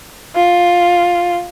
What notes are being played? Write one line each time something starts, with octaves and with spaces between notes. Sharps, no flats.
F4